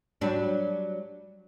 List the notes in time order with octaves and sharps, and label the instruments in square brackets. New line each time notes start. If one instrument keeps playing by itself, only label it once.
[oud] F#3 G3 D4